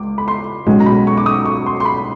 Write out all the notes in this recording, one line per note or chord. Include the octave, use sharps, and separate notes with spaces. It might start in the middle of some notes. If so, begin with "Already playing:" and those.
Already playing: C#2 D6
B5
C6
B1 B2 G#3 C#4
A#5
B5
C#6
D6
D#6
C#6
C6
C6
B5